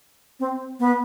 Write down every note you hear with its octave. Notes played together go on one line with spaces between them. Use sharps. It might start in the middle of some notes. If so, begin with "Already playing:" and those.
C4
B3